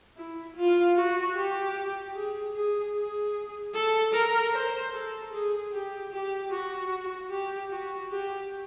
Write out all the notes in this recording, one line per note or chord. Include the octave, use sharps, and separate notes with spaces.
E4
F4
F#4
G4
G#4
G#4
G#4
A4
A#4
C5
A4
G#4
G4
G4
F#4
G4
F#4
G4